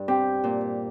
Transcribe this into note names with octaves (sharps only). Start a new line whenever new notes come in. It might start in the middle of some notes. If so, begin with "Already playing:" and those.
Already playing: G2
C4 G4
A#2